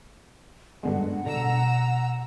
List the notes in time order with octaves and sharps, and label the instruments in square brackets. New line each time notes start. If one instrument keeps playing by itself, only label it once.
[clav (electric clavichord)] G2 D3 G#3 [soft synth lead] B3 [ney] F#5
[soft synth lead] B2 [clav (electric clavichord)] D3 [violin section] A#5 E6